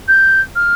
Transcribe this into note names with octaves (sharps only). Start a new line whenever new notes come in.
G6
F6